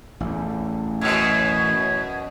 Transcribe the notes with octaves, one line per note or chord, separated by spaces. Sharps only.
A1 E2
F#2 B2 G#6